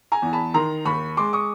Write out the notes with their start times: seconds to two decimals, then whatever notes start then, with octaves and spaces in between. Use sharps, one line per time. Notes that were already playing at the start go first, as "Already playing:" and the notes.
0.12 G#5 A#5
0.22 E2
0.33 A5 B5
0.54 D#3 A#5 C6
0.85 D#2 B5 C#6
1.17 G#3 C6 D6
1.33 C#6 D#6